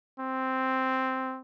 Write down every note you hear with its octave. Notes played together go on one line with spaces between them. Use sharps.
C4